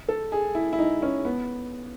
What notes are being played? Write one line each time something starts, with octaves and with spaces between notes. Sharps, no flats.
A4
G#4
E4
E4
D#4
C#4
B3